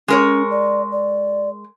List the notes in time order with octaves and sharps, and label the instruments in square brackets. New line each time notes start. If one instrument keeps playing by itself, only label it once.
[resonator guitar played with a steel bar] G#3 A#4 C#5 [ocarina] C#4
[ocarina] D5
D5